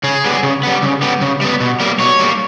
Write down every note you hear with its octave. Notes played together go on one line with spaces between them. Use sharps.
C#3 G#4
G3 B3
C#3
G3 B3
C#3
G3 B3
C#3
G3 B3
B2
G3 A#3
B2 C#5
G3 A#3